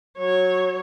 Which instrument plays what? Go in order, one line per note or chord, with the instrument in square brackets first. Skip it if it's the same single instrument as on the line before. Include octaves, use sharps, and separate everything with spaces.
[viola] F#3 C#5